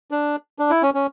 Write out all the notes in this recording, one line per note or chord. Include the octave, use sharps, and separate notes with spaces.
D4
D4
E4
C#4
C#4